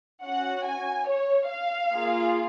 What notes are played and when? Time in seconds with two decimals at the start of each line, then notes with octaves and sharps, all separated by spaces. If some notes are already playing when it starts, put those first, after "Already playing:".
0.23 C#4 F#4 F#5
0.66 G#5
1.08 C#5
1.50 F5
1.92 A#3 F4 G#4